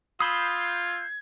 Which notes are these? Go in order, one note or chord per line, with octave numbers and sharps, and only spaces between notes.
F4 B5 D#6 E6 G6 G#6 C7